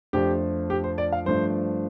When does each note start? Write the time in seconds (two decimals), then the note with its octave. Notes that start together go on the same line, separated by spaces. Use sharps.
0.13 F2 F3 A3 D4 G4
0.70 G4
0.84 C5
0.98 D5
1.12 F5
1.26 G2 F3 A3 D4 C5